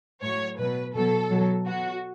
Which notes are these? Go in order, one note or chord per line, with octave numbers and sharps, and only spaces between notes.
A2 F#3 C#5
B2 F#3 B4
B2 F#3 A4
B2 F#3
B2 F#3 F#4